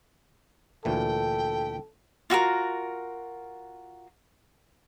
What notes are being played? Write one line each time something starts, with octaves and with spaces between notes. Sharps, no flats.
D2 A#2 E3 A4 G5
F4 F#4 A4 A#4